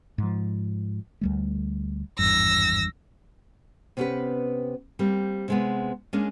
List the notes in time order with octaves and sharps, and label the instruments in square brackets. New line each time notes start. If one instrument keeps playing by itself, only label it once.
[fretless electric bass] G#2 F3
D2 G3 A3
[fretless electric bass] G#1 E2 G2 [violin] E6 A#6
[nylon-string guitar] C3 B3 C#4 F#4 G4 B4
G3 A#3 C4
C3 G#3 B3
G#3 A#3 C#4 D4